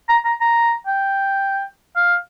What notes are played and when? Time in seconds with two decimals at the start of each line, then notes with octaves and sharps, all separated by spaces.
0.09 A#5
0.25 A#5
0.41 A#5
0.87 G5
1.96 F5